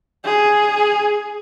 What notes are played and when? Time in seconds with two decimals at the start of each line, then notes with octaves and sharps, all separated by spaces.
0.24 G#4